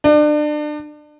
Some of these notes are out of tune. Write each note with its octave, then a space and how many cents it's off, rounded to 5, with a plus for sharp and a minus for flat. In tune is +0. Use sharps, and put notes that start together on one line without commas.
D4 +30